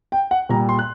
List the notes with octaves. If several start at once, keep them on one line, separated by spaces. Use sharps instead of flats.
G5
F#5
A#2 G3 A#5
C6
F#6